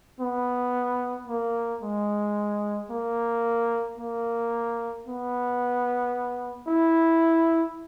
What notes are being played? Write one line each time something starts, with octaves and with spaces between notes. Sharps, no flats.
B3
A#3
G#3
A#3
A#3
B3
E4